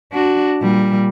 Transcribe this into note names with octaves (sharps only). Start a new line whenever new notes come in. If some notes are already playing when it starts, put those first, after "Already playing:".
D4 F#4
A#2 G3